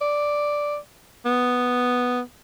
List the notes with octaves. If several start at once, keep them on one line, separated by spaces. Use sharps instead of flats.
D5
B3